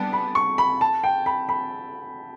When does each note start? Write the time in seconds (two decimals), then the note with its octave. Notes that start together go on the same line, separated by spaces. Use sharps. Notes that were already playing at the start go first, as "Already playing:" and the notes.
Already playing: G3 B3 D4 G5 A5
0.13 B5
0.35 C#6
0.58 B5
0.81 A5
1.04 G5
1.26 B5
1.49 B5